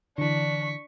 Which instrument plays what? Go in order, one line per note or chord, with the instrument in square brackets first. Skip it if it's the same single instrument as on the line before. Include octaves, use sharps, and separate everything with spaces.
[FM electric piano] D3 E3 [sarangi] D4 [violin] C#6 B6